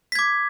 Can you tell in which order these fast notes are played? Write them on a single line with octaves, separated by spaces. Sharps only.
B6 G#6 D6